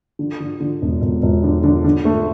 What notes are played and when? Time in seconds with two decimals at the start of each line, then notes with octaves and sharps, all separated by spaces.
0.19 D3
0.40 D3
0.61 D3
0.82 E1
1.02 E1
1.22 E1
1.44 D3
1.64 D3
1.84 D3
2.05 A3